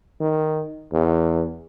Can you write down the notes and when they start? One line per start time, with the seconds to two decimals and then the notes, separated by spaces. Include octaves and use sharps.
0.20 D#3
0.93 E2